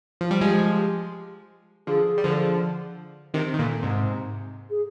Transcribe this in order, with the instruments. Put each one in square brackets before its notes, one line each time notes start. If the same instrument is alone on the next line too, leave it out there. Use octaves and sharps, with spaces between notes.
[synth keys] F3
G3
[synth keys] F3 G#3 [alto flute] G4
[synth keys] D3 F3 [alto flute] G#4
[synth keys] G3
D3 F3
C3 D#3
D#3
A#2 D3
G#2 C3
[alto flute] G#4